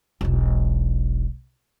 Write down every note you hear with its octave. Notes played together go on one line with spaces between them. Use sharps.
E1 B1